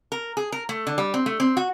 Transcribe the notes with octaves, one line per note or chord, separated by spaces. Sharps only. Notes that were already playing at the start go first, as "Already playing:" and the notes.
A#4
G#4
A#4
A3
D3
G3
C4
A3
C4
F#4